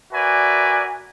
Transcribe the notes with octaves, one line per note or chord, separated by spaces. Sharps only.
F#4 A#4 B4 D5 E5 G#5